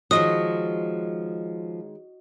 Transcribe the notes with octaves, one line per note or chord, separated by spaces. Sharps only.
D#3 F3 G#3 F#4 C#5 D#5 D#6